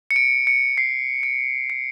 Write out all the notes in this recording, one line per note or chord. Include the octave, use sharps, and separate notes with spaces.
C#7
D7
C#7
C7
D7
C#7